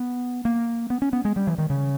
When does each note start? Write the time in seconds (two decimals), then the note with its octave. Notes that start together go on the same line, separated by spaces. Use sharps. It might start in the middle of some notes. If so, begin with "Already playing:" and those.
Already playing: B3
0.45 A#3
0.90 B3
1.02 C#4
1.13 B3
1.25 G#3
1.36 G3
1.47 E3
1.58 D#3
1.70 C#3